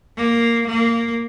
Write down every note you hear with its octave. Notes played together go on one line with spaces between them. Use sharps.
A#3
A#3